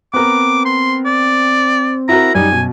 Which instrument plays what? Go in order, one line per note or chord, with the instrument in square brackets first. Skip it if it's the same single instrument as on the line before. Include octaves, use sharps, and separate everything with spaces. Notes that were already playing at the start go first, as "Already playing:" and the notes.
[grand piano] B3 A#4 [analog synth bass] C4 [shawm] D6
[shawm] C6
D5
[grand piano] E4 F#4 A#4 [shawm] A#5
[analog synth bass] F#2 [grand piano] G3 D#4 [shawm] G#5
[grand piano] B2